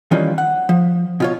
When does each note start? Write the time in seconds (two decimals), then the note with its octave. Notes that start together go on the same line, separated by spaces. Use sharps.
0.11 D#3 E3 G3 A#3 C#4 F4
0.38 F#5
0.69 F3
1.20 B2 F4 C#5